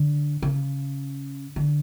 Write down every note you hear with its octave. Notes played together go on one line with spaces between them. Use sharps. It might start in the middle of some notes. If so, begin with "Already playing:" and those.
Already playing: D3
C#3
D3